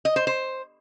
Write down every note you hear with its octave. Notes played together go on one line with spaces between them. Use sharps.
D#5
C5
C5